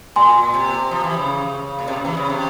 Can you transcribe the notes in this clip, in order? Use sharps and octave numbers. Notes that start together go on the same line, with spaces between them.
A#2 G#5 C6
C3
F3
E3
C#3
A#2
C3
C#3
E3
C#3
C3